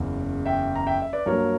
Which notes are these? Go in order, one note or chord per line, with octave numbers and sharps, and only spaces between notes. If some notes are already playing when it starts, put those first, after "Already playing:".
Already playing: F#1 E2 C#3
E5 G5
A#5
E5 G5
E5
B4 D5
G2 F#3 A#3 A#4 C#5